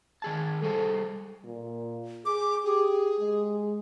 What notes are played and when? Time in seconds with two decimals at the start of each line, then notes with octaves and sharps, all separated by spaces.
0.22 D#3 G#4 A5
0.62 G3 G#4 A4 C5
1.44 A#2
2.26 G#4 D6
2.65 G4 G#4
3.19 G#3